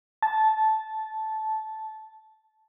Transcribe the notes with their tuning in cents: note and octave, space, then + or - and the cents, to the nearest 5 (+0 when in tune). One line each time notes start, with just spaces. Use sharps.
A5 -10